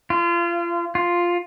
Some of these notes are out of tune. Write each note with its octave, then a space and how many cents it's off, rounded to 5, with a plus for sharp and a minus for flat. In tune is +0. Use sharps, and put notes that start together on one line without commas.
F4 -30
F4 +0